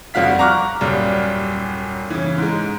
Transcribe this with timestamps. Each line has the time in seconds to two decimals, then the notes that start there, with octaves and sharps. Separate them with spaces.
0.14 F2 G3 F#4 F5 B6
0.39 A#5 C#6 D6 F6 F#6
0.81 D#1 F#2 G3
2.10 C#3 E3
2.38 G#2 G#3